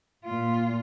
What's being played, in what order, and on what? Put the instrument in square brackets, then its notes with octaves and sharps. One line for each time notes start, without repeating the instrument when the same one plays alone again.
[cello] A#2 F4